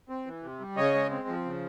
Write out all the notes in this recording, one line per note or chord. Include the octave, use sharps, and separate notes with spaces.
C4
E3
C3
G3
C#3 C#5 D#5
G#3
C4
F3
C#3